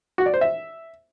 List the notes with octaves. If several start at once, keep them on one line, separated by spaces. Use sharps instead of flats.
F#4
D5
C5
E5